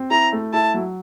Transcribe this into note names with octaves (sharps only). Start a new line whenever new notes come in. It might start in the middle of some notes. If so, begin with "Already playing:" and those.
Already playing: C4
E4 A#5
A3
E4 A5
F#3